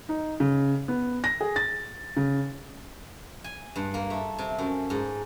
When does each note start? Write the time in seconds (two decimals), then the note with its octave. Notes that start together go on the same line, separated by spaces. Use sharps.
0.09 D#4
0.40 C#3
0.88 B3
1.24 A#6
1.41 G#4
1.56 A6
2.17 C#3
3.44 G#5
3.76 G2
3.94 A#3
4.10 A3
4.38 C3
4.58 F#2
4.90 G#2